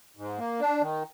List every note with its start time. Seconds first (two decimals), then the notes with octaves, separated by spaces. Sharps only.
0.17 G#2
0.38 A#3
0.60 D4
0.81 D#3